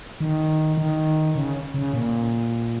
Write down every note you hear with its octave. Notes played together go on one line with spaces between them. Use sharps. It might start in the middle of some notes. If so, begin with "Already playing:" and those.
D#3
D#3
C#3
C#3
A#2